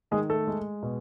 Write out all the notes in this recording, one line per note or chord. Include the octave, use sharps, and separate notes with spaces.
D#3 G#3 G#4
A3 A4
G#3
B2